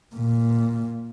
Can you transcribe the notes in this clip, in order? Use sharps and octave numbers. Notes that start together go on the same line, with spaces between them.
A#2